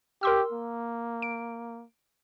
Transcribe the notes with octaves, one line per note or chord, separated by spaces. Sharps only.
G4 A#4 C6 E6
A#3
D7